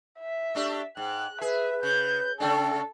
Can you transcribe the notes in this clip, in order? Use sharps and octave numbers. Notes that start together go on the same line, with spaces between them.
E5
A3 D4 G4
G#2 G5 F#6
G#4 B4 E5
C#3 G6
C#3 A3 D4 A4 G5